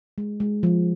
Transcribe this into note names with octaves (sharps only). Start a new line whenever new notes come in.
G#3
G#3
F3